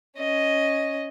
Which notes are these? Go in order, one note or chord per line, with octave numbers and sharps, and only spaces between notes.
C#4 D#5